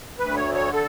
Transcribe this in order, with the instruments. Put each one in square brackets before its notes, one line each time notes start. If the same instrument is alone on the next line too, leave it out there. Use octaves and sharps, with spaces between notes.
[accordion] D2 B4
C#5
D3
C#5
A4